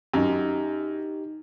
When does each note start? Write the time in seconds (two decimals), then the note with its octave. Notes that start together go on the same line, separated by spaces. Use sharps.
0.13 F#2 D#4 G4